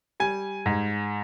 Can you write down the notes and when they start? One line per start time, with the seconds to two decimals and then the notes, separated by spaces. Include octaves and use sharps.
0.20 G3 G#5
0.66 G#2